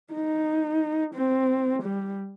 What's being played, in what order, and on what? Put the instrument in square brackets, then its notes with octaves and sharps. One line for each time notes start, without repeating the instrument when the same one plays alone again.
[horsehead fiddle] D#4
C4
G3